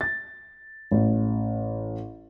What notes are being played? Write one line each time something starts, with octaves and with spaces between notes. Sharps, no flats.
A6
A1